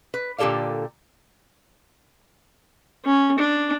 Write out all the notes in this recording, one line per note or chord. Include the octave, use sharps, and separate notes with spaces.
B4
A#2 D3 G4 A4 D5 F5
C#4
D4